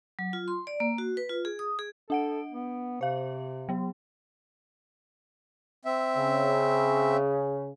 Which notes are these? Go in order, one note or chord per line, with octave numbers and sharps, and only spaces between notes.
F#3
F4
C6
D5
A#3
F#4
B4
F4
G#4
D#6
G#4
D4 A4 F#5 D7
B3
C3 C5 F5
F#3 B3
C4 E5
C#3